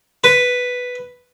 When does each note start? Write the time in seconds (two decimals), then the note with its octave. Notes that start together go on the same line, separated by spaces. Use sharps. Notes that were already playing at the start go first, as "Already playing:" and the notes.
0.24 B4